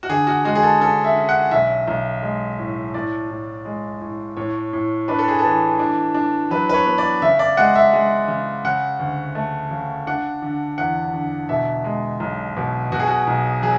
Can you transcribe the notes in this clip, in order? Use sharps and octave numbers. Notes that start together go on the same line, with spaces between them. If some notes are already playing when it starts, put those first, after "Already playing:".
F#4
D3 G#4
F#4
G#3 F#4
G#4
A4
C#4 A4
E5
C#4
F#5
B1 E5
B1
G#3
A2
A2 D5
A2
G#3
A2
A2 C#5
A2
D4 B4
A4
G#4
E3 A4
D4
D4
F#3 B4
B4
C#5
B3
D5
C#3 E5
D5
G#3 F#5
E5
G#3
C#3
C#3 F#5
D2
A3
C#3
D4 F#5
D3
E2 F#5
D3
B2 E5
G#3
B1
B2
B2 F#4
G#4
F#4
B1
F#3 G#4